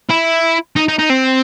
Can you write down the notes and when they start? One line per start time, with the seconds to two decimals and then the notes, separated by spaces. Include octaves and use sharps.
0.09 E4
0.76 D#4
0.88 D#4
0.99 D#4
1.10 C4